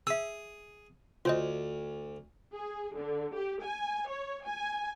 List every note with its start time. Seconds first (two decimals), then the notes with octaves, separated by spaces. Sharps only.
0.07 G#4 E5 E6
1.25 D2 F4 C5 D#5
2.55 G#4
2.97 D3
3.34 G4
3.64 G#5
4.10 C#5
4.46 G#5